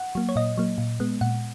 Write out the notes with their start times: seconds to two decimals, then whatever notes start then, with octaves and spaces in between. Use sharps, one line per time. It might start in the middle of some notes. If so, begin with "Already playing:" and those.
Already playing: F#5
0.15 F#3 A#3
0.29 C#5
0.36 A#2 D#5
0.58 F#3 A#3
0.78 A#2
1.00 G#3 B3
1.21 A#2 F#5